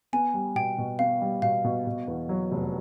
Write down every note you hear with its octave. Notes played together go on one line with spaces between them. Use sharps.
B3 G#5
G3
B2 G5
B2
B3 F5
G3
B2 F5
B2
B2
E2
F#3
F1